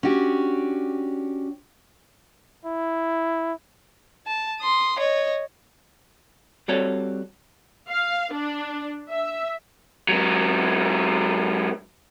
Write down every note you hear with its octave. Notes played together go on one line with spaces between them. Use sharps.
C#4 D4 F#4 G4
E4
A5
C6 D#6
C#5 D#5
G3 C4 F#4 A4 C#5 D5
F5
D4
E5
G#2 F#3